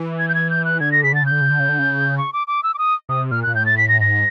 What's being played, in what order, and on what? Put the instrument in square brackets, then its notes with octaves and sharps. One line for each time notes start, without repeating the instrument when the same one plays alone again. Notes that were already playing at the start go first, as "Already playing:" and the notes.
Already playing: [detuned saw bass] E3
[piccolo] G#6
G6
G#6
G6
F#6
[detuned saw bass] D3 [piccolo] G#6
[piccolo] A#6
[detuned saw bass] C#3 [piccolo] B6
[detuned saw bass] D3 [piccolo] A6
[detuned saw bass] C#3 [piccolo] G6
[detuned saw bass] D3
C#3
D3
C#3
D3
C#3
[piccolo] C#6
D6
D6
E6
D6
D#6
[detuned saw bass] C3 [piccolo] D#6
[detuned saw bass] A#2 [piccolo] F6
[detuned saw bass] A#2 [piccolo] F#6
[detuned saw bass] A2 [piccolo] G6
[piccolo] A6
B6
A#6
[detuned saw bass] G#2 [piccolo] A#6